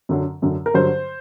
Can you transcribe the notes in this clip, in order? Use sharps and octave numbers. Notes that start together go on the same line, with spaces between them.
F#2 D3 F#3
F#2 D3 F#3
A#4
G2 D3 F#3 C5